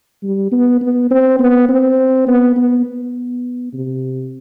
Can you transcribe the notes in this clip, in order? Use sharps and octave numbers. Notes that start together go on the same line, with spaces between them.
G3
B3
B3
C4
B3
C4
B3
B3
B3
C3